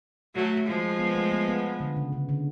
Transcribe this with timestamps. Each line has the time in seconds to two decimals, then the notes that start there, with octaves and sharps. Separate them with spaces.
0.35 F#3 A3
0.67 F3 G#3
0.99 B3
1.15 A3
1.32 B3
1.48 B3
1.80 D3
1.96 C#3
2.13 C#3
2.29 D3